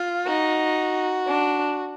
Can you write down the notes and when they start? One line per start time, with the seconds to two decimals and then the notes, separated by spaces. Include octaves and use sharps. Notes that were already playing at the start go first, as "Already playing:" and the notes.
Already playing: F4
0.26 D#4 F#4
1.27 D4